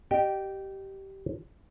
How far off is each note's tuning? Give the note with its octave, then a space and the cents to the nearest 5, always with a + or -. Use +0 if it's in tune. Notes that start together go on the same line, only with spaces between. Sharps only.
G4 -15 D#5 -30 G5 +0